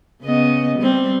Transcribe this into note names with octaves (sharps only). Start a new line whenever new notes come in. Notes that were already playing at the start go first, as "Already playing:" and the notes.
C#3 B3 D#5
G3 C4